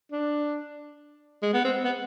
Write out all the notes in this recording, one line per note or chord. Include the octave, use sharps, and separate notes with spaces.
D4
G#3
B3
C4
B3